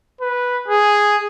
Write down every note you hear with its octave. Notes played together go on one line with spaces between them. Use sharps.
B4
G#4